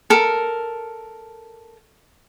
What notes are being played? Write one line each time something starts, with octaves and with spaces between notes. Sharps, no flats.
A4 A#4